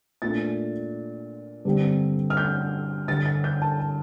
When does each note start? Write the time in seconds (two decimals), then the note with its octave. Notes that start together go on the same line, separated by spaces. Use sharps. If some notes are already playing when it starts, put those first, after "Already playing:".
0.22 A#2 A3 D4 A6
1.65 G2 D3 G3 C4
2.30 F6
2.37 G6
3.08 G2 D3 G3 A6
3.26 A6
3.44 G6
3.62 A5
3.79 A5